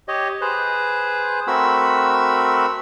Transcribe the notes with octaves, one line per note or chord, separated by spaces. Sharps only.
G4 C#5 D#5
G#4 B4 C5
A3 C4 F#4 A#4 B5 E6